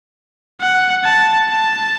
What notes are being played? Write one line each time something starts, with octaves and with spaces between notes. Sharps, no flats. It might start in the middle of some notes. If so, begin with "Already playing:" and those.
F#5
A5
A5